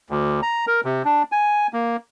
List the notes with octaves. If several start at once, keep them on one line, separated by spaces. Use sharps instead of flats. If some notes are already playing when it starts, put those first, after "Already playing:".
D2
A#5
A#4
C3
D4
G#5
A#3